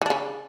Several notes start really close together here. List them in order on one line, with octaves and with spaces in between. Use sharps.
E3 D4 C#3